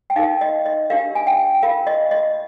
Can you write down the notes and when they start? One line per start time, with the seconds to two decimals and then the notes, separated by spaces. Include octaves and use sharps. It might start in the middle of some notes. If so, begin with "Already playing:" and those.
0.10 G5
0.16 D#4 F5
0.19 A#4
0.41 D#5
0.66 D#5
0.90 D4 G4 A#4 F5
1.15 G#5
1.27 G5
1.63 F4 A#4 F5
1.87 D#5
2.11 D#5